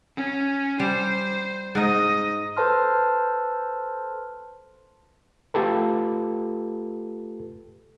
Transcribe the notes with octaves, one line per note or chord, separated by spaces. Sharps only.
C#4
G3 C5
G#2 D#4 D#5
A4 B4 C5 A5 C6 F6
A3 F4 G4 A4 B4